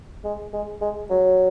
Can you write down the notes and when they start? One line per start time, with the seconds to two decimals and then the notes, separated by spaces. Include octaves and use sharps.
0.24 G#3
0.53 G#3
0.81 G#3
1.10 F#3